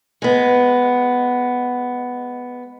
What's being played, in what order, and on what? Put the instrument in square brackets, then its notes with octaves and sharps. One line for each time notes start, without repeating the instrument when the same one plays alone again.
[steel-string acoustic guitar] G#3 B3